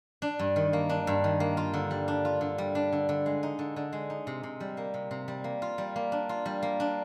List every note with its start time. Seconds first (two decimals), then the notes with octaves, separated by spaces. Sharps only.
0.22 D4
0.39 G2
0.56 D#3
0.73 A#3
0.89 D4
1.07 G2
1.24 D#3
1.40 A#3
1.57 F4
1.74 D3
1.91 G3
2.08 D4
2.25 F4
2.41 D3
2.58 G3
2.75 D4
2.92 D3
3.09 D3
3.26 G#3
3.43 D#4
3.59 D3
3.76 D3
3.93 G#3
4.10 D#4
4.27 C3
4.43 C3
4.60 G3
4.77 A#3
4.94 C3
5.11 C3
5.28 G3
5.44 A#3
5.62 F4
5.78 G3
5.96 A#3
6.12 D4
6.29 F4
6.46 G3
6.62 A#3
6.80 D4